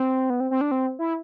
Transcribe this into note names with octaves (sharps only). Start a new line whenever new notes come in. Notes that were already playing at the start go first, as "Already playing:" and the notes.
Already playing: C4
B3
C4
C4
D4
C4
E4